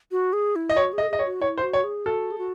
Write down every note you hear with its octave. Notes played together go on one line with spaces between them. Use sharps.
F#4
G#4
E4
D#5
F#4 C#5
G#4
D#5
A4
G#4 D#5
C#5
F#4
E4 C#5
C5
F#4
C#5
G#4
F#4 A4
G#4
F#4